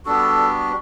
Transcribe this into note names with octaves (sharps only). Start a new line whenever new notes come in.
G3 B3 D4 F#4 A4